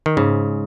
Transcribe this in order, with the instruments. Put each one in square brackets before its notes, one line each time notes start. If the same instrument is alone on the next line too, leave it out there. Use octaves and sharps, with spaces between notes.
[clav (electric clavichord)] D#3
[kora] G#2 [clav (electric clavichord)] C#3